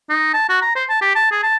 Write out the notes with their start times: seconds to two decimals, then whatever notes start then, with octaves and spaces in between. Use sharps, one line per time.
0.10 D#4
0.34 A5
0.49 F#4
0.62 A#5
0.76 C5
0.89 A5
1.02 G4
1.15 A5
1.31 G#4
1.43 A5